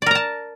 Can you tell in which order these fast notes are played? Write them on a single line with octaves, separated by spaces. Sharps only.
D5 A#4 A#5 A5